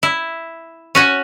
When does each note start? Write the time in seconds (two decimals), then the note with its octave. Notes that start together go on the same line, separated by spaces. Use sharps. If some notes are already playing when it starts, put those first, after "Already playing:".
0.03 E4
0.95 C#4 F#4 C#5